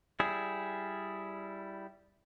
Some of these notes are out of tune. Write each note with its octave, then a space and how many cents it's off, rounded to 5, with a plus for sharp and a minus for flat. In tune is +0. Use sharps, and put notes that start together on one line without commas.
G3 -10 E4 +0 G#4 +0